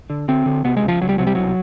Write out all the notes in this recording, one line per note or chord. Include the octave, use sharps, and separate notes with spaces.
D3
D3 C4
D3
C3 B3
G#3
C#2
F3
C#2 F#3
G3
C3 F#3
G3
C2 F#3